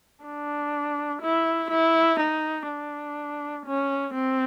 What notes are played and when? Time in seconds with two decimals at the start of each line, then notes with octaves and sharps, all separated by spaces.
0.24 D4
1.22 E4
1.71 E4
2.20 D#4
2.68 D4
3.66 C#4
4.14 C4